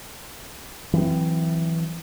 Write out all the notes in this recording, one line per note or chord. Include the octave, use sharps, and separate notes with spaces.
E3 F#3 A#3 C4